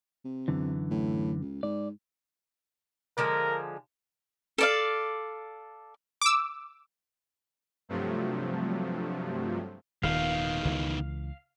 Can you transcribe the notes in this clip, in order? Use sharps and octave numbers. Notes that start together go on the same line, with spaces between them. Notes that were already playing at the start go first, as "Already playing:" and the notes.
C3
F#2 D3 E3
A2
C#2
G#2 D5
D3 F3 G#3 A#4
A4 D5 F5
D6 E6
G2 C3 F3 F#3 A3
D#1 D#3 B3 F5
C#2 E3